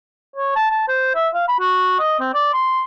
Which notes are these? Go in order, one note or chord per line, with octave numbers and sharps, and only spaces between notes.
C#5
A5
A5
C5
E5
F5
B5
F#4
D#5
C4
D5
C6